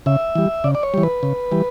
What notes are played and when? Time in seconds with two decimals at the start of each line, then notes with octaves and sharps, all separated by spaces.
0.06 C#3 E5
0.35 E3 G3
0.64 C#3 D5
0.75 D5
0.83 C#5
0.94 E3 G3
1.03 B4
1.23 C#3
1.52 E3 G3